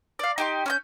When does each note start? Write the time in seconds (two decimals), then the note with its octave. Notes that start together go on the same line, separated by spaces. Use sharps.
0.19 D5 F5
0.38 D#4 G4 C6
0.66 C#4 C#6 G6